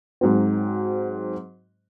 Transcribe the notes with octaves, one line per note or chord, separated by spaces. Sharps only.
G#2 F#3 C4